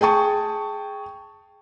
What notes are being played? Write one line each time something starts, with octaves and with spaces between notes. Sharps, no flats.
G#4 G5 A5 C#6